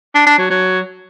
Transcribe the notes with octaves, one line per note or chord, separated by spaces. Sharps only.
D4
D4
F#3
F#3